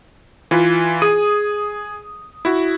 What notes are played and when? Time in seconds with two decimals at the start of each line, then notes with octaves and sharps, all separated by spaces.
0.51 E3 F4 B4
1.02 G#4 D#6 D#7
2.45 E4 F#4